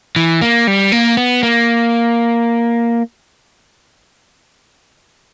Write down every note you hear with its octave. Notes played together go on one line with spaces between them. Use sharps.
E3
A#3
G3
A#3
B3
A#3